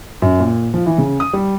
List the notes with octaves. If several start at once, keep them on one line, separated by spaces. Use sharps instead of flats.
F#2
A#2
F3
E3
C#3
D#6
G3